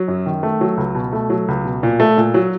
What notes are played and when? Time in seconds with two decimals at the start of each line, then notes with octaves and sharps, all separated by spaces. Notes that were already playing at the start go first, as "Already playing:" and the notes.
Already playing: F#3
0.08 F#2
0.26 D#3
0.43 A3
0.61 F#3
0.77 C#2
0.95 B2
1.13 A3
1.30 F#3
1.48 C#2
1.65 B2
1.83 A#2
2.00 A3
2.17 A#2
2.34 F#3